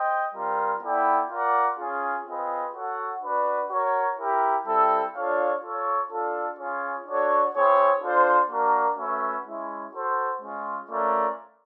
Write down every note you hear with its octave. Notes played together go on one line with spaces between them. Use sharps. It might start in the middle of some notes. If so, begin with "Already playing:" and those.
Already playing: C5 D#5 G5
G3 C4 F4 A#4
B3 E4 A4 D5 G5
F4 A#4 D5 F#5
C#4 F4 G#4
C4 F4 G#4 B4 D#5
F#4 A4 C#5 F#5
D4 F#4 B4
F#4 A#4 C#5
E4 G4 A#4
G3 C4 E4 A4
D4 F4 A4 C#5 F5
F4 A4 C#5
D4 F4 A4
C#4 F4 G#4 C#5
D4 F#4 A4 C#5
C4 E4 G#4 C#5
D4 F4 A4 C5
A#3 D4 F#4 A#4
A3 C#4 F#4 B4 E5
G#3 C#4 E4
F#4 A4 C5
G#3 C#4 F4
A3 C#4 F4 A#4 D5